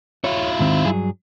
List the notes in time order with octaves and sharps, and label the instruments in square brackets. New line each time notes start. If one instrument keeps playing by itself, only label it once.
[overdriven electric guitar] E4 F4 [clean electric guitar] C#5
[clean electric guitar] G#2 D#3 C4
G2 F#3 G#4